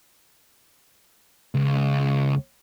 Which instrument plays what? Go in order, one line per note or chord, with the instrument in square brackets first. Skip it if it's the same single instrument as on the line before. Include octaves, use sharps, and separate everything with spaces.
[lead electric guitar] C#2